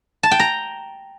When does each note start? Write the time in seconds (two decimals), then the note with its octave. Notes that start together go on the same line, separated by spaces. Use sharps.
0.23 A5
0.31 G5
0.40 A#5